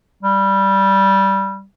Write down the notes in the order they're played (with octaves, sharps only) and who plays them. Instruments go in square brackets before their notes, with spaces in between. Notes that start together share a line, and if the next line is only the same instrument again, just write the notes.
[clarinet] G3